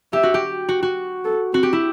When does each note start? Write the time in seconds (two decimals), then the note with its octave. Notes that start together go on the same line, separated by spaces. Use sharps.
0.13 G4 E5
0.23 F#4
0.34 G4
0.69 F#4
0.83 F#4
1.25 A4
1.53 C4 F#4
1.63 G4
1.73 E4